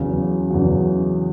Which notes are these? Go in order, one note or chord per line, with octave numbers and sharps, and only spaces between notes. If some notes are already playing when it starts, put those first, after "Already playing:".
Already playing: E2 C#3 F#3
E2 C#3 F#3